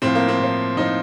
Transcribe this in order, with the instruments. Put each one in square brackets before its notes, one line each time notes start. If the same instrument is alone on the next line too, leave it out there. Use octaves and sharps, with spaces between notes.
[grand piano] A2 F3 C4
A#3
C4
A2 F3
A2 F3 D#4